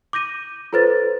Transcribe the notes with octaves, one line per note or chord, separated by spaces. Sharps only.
D6 G6 A#6 D#7
F4 A4 B4 C5 A6